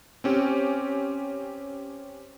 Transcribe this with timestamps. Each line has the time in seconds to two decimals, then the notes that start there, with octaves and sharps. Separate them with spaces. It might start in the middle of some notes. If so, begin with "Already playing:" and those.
0.24 C4 C#4 G4